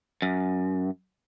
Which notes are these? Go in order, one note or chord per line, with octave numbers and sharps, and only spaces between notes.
F#2